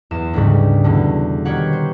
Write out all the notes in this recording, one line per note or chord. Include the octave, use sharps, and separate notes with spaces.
E2 E7
D2 G#2 C#3 G3
E2 B2 D3
D#3 F#4 G4 C#5 F#5
C5